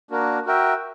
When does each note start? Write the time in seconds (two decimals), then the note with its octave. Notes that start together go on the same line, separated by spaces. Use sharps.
0.11 A#3 D4 F#4 A#4
0.46 F#4 A#4 E5 G5